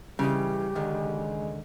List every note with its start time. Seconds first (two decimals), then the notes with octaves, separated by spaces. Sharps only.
0.19 C#3 E3 G3 G4 D#5
0.75 C#2 D3 D#3 G#3